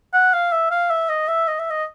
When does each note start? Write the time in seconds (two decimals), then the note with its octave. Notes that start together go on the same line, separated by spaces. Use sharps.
0.14 F#5
0.33 F5
0.52 E5
0.71 F5
0.90 E5
1.09 D#5
1.28 E5
1.48 D#5
1.59 E5
1.70 D#5